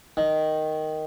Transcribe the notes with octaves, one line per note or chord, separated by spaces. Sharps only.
D#3